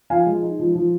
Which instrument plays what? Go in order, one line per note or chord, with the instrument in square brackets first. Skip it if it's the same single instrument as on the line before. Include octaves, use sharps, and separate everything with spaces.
[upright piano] F3 F5 G#5
G#3
D#4
F3
F3